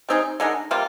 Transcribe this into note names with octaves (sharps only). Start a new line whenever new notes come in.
G3 C4 D#4 G#4
D3 G#3 D#4 A#4
C3 G3 A#3 F4